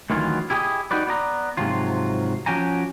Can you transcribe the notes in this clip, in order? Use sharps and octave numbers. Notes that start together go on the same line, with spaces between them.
D2 D#3 E3 F#3 F4
E4 G4 G#4 B4 D#5
D#4 F#4 G4 B4 D5
B3 D5 A#5
G#2 C3 F3 F#3 F4
F3 C#4 F#4 G4 G#5 A#5